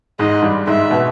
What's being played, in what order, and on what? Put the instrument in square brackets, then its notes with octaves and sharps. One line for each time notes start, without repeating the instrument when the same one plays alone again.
[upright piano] G#2 G#3 [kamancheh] D#5
[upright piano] G2 G3
[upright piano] G#2 G#3 [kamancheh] E5
[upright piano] B2 B3